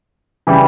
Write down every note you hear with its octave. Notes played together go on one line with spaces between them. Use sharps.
C#3 E3 G3